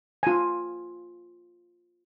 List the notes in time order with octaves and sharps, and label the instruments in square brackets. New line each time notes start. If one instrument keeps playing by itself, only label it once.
[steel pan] F4 G#5